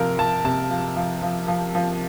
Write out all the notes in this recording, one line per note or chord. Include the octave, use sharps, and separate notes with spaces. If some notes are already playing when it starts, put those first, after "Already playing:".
Already playing: C3 F3 A#4
F3 A5
C3 A5
F3
F3
F3
F3
F3